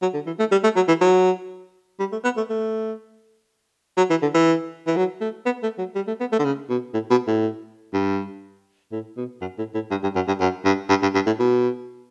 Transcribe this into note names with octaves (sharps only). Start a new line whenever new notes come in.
F#3
D3
E3
A3
G3
A3
F#3
E3
F#3
G3
A3
B3
A3
A3
F#3
E3
D3
E3
E3
F#3
A3
B3
A3
F#3
G3
A3
B3
A3
D3
C#3
B2
A2
B2
A2
G2
A2
B2
F#2
A2
A2
G2
G2
F#2
G2
F#2
G2
G2
G2
G2
A2
B2